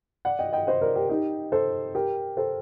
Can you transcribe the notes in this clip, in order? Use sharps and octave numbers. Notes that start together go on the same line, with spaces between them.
D5 F#5
D#5 G5
D#5 G5
C5 D#5
A#4 D5
G4 A#4
D#4 G4
A4 C5
G4 A#4
A4 C5